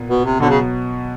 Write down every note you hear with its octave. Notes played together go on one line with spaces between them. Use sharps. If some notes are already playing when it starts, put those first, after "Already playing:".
Already playing: A#2 B3
B2
C3
B2 D3 F#3 B3
C#3